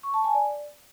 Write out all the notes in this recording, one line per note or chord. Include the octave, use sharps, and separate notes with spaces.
C#6
A5
G#5
D5